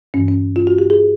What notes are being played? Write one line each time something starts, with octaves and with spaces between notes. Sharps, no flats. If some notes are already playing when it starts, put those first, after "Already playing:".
G2 E3 C#4
C#4
F4
F#4
G4
G#4